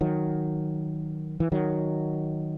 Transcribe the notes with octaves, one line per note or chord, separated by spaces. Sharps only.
D#3 F#3
E3
D#3 F#3